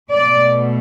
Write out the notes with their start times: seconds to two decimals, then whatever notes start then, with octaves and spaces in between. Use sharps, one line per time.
0.11 B2 A3 D5